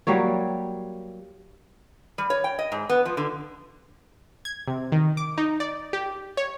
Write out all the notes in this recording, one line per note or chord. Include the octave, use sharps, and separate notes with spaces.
F#3 G3 A#3 C#5
G3
C#5
G5
D#5
G#2
B3
F3
D3
G#6
C3
D#3
D6
D#4
D5
G4
C#5